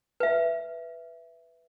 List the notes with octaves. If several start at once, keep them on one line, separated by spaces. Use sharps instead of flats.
B4 E5